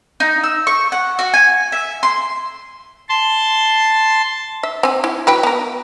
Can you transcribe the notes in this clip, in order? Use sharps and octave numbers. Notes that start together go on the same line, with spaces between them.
D#4
E6
C#6
F#5
F#4
G#5
E5
C6
A5 C6
E5
C4 G#5
E4
F#3 B4 G5
B3 A#4